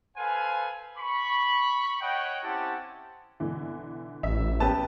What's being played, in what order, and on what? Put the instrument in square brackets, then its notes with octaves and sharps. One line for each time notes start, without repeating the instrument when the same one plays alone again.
[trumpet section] A4 B4 C5 F5 G#5
B5 C#6
C#5 D#5 F#5 G5
C4 C#4 E4 G4 F#5 A5
[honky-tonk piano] B1 D3 E3
[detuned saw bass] A1 [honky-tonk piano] E5
[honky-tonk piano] B3 C#4 G4 [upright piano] B4 A5